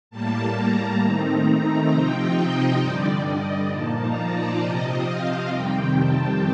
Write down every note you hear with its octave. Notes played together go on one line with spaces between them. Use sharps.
A2 G3 A#3 A5
A#5
D#3 A3 C4 D#4
C3 F3 C4 D#4 G5
D#5
G2 D3 G3 D5
D#5
A#2 F3 A#3 D#4 A5
A#5
D5
C3 F3 C4 D#5
F5
F2 C3 D#3 G3 C4 G5
A5